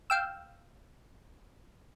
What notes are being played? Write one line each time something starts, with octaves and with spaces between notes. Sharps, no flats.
F5 G5 E6